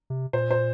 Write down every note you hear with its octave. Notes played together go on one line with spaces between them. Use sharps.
C3
A#2 C5
C5